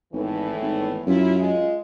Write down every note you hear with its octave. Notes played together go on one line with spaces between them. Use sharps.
G#1 E2 A2 E3
G#1
F#2 E4 F4
G#3 F4